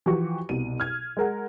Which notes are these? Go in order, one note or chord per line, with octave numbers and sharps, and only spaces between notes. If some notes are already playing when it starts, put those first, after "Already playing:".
E3 F3 F#4 G4 C#6
C2 B2 D#7
F6 G#6
G#3 A#4 F#5